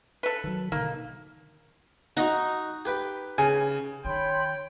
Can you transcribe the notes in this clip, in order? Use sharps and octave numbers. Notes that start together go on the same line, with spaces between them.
A4 B4
D#3 F#3
B2 D3 D#3 A#3
D#4 F#4 D#5 F#5
G4 B4 G5
C#3 G#5
D#3 C#5 G5 B5 C6